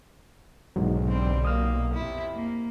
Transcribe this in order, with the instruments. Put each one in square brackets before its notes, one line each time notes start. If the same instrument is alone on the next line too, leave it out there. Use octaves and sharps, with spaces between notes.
[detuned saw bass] B1 [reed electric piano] G#2 B2 F#3
[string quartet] D3 G3 C4
[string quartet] A#2 A#3 [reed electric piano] D#6 F6
[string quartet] F2 C3 E4
A#3